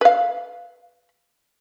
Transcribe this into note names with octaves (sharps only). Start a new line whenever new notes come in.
B4 F5